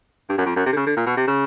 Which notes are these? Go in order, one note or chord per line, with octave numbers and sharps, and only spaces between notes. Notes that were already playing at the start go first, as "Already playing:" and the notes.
G2
F#2
F2
F#2
C3
D3
C#3
D3
A#2
B2
C3
C#3